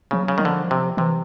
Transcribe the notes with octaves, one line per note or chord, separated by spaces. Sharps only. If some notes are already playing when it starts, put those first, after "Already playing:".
C#3 F3
F#3
C#3
D#3 F#3
D3 F3
C3
C3 E3